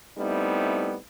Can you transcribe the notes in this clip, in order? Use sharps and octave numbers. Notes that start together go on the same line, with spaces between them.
G3 A3 B3 C4 D#4 E4